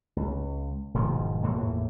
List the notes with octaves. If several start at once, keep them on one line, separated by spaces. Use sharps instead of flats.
C#2
E1 G#2 D#3 F3
G1 E2 A2 A#3